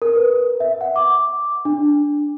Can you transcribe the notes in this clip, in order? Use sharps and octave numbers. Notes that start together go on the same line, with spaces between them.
A#4
B4
E5
F#5
D6
D4